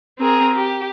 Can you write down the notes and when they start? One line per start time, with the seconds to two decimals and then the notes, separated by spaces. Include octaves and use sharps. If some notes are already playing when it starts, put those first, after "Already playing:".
0.20 C4 G#4 A#4
0.56 G4